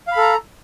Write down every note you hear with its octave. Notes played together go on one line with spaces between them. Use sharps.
A4 F5 A#5 B5